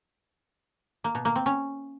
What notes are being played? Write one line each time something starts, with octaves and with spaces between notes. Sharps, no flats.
A#3
B2
A#3
C4
C#4